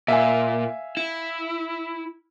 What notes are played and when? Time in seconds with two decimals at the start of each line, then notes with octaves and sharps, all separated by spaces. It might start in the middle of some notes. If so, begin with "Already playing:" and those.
0.08 A#2 E5 F5 G#5
0.97 E4